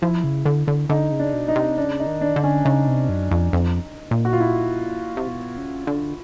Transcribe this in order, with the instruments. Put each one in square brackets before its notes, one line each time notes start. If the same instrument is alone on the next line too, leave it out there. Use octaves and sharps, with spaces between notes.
[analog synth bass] F3 [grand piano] E4
[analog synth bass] C#3
D3
D3
[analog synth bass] D3 [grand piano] D#4
[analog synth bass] C#3
[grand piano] D4
[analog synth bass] B2
[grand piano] D#4
[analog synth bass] C3
[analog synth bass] C#3 [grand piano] D4
[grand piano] D#4
[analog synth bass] D#3
[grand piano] D4
[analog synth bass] D3
[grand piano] C#4
[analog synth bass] C#3 [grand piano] D#4
[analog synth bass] C3
F#2
F2
F2
A#2
[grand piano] F#4
F4
E4
[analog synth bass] C3
B2
C#3
D3